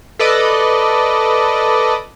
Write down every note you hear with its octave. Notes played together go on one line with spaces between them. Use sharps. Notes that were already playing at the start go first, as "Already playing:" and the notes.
A4 B4 D5 D#5